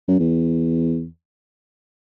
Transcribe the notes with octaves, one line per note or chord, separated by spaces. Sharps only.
F#2
E2